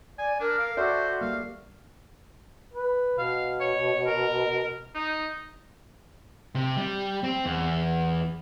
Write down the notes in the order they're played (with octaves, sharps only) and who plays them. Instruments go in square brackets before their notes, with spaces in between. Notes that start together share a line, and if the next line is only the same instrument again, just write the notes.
[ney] D5 [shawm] G#5
[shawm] D4 [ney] A#4
[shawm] F5
[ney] F#4 [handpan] A4 D5 E5 [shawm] C5
[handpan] G3 A#3 [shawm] F5
[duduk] B4
[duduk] B2 [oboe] F5
[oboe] C#5
A#4
D#4
[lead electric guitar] C3
G3
C4
E2